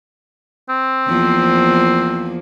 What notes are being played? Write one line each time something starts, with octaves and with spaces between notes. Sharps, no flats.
C4
E2 F3 A#3